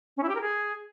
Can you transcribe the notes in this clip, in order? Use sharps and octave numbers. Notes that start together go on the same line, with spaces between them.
C#4
E4
G4
A#4
G#4